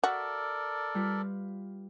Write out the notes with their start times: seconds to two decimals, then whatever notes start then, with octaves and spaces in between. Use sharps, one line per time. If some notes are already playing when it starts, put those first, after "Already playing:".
0.04 F#4 A4 A#4 D5 E5 A5
0.95 G3 F4 B4